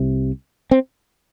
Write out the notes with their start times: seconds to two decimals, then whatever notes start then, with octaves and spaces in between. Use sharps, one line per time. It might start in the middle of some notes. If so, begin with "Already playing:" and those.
Already playing: C2 C3
0.71 C4